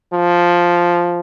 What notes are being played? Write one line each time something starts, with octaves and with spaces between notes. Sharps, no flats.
F3